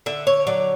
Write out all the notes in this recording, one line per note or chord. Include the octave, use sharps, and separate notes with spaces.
D3 E5
C#5
F#3 D5